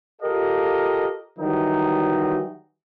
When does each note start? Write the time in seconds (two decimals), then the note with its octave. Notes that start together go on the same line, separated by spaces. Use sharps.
0.22 F4 G4 A4 A#4 D#5 F5
1.38 D#3 E3 F#3 G3 D#4